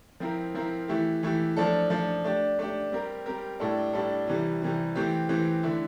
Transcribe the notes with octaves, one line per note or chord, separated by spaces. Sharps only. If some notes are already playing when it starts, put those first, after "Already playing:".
F3 C4 E4 A#4
F3 C4 E4 A#4
E3 A3 E4 G4
E3 A3 E4 G4
F3 A3 D4 A4
F3 A3 D4 A4
A3 D4 G4
A3 D4 G4
G3 C4 G4 A#4
G3 C4 G4 A#4
A2 G3 D4 A4
A2 G3 D4 A4
C3 E3 G3
C3 E3 G3
E3 A3 C4 G4
E3 A3 C4 G4
D3 A3 E4